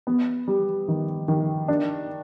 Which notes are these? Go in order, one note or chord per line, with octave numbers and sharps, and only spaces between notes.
B3
G3
D#3
D#3
D4